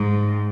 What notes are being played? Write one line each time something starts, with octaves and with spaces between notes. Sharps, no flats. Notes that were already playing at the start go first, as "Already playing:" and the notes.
Already playing: G#2